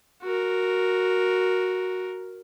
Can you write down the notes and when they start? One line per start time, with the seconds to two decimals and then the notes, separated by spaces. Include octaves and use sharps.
0.23 F#4 A#4